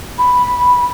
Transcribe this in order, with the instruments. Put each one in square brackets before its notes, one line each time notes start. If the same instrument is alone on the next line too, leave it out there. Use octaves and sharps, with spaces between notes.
[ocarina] B5